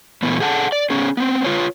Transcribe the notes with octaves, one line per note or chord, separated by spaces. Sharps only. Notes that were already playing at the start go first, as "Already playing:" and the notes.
A#2 E3 A3 B3
G#4 A4 F#5 G5 A5
D5
B3 C#4 G#4
B3 C4
F4 B4 C#5